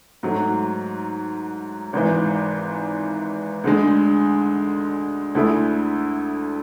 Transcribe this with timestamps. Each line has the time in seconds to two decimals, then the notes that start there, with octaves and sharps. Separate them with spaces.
0.23 G#2 F#3 A3
1.93 G#1 G#2 E3
3.64 D2 D3 G#3
5.35 D2 D3 A3 E4 G#4